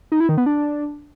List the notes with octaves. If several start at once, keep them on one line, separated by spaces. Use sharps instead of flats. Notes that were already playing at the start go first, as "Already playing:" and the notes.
D#4
E4
D#3
B3
D4